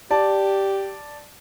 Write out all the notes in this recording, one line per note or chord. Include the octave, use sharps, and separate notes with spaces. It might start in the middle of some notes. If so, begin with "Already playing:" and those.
G4 D5 A5